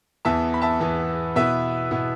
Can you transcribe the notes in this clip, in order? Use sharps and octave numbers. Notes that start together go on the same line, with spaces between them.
E2 E3 B3 E5 A5
B5
E5 A5
E2 E3 B3
B2 B3 E4 B4 E5
B2 B3 E4